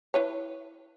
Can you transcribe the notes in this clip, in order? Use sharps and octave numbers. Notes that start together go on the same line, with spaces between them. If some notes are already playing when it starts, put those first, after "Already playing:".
E4 B4 C#5